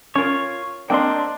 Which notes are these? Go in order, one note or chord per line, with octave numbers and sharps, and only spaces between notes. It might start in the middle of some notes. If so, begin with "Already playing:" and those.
C#4 F4 A#4 C#5
A#3 C4 D4 D#5 G5 C6